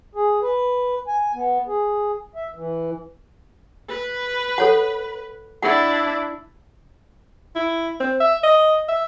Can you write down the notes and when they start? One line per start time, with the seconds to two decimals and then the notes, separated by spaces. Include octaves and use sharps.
0.15 G#4
0.43 B4
1.07 G#5
1.34 B3
1.67 G#4
2.35 E5
2.55 E3
3.88 B4
4.58 A4 C#5 F#5
5.62 D4 E4 F#5
7.56 E4
8.00 C4
8.20 E5
8.43 D#5
8.88 E5